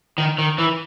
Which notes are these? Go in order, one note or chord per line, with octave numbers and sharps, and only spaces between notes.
D#3
D#3
E3